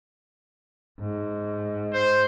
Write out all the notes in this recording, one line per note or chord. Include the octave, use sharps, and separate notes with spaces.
G#2
C5